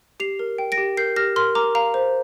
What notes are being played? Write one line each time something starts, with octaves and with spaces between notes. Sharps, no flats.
G4 C7 F7
A#4
G5
A#6 D7
G4
A#4 G6 C7
G4 F6 A#6
A#4 C6 F6
A#4 A#5 D6
F5 A#5
C5